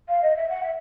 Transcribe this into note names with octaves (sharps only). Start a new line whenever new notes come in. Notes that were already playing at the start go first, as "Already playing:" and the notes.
F5
D#5
E5
F#5
E5